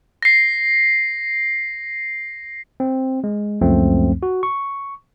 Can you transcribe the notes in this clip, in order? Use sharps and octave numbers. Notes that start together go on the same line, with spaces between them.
A#6 C7
C4
G#3
C#2 F#2 F3 A3 C4
F#4
C#6